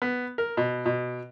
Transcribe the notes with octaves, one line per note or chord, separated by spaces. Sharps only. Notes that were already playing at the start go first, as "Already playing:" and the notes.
B3
A#4
B2
B2